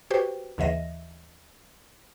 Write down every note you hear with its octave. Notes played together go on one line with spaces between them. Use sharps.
F#4 G4 B4 C5 G5
D#2 C#3 E3 D#5 E5 A#6